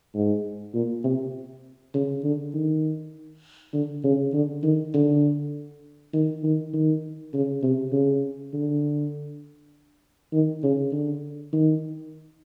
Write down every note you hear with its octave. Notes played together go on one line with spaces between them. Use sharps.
G#2
A#2
C3
C#3
D3
D#3
D3
C#3
D3
D#3
D3
D#3
D#3
D#3
C#3
C3
C#3
D3
D#3
C#3
D3
D#3